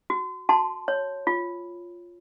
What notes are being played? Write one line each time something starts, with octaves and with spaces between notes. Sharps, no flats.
F#4
F#4 A5 C6
C#5
F4